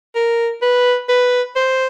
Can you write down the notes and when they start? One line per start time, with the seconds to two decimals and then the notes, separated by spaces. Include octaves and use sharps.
0.15 A#4
0.62 B4
1.09 B4
1.56 C5